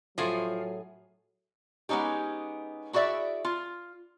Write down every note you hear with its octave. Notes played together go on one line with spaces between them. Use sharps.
A2 F3 F#3 G#4
G#3 B3 C#4 D#4 G4
E4 F#4 G#4 D5 E5
F4